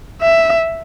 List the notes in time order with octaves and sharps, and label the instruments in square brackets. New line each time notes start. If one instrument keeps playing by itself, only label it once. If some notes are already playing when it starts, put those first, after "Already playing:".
[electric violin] E5